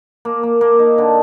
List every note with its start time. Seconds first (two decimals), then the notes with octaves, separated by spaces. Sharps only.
0.25 A#3
0.43 A#3
0.61 A#3
0.79 D#4
0.98 D3